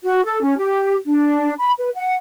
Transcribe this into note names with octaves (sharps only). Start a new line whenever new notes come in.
F#4
A4
C#4
G4
D4
B5
B4
F#5